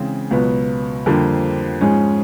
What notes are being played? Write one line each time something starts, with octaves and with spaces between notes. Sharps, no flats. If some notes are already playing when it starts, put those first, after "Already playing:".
Already playing: C#3 E3 G#3 C4
C#2 B2 F#3 B3
F2 D3 G3 A#3
G#2 F3 G#3 C#4